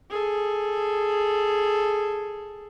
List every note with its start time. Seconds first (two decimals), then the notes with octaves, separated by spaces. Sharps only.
0.10 G#4 A4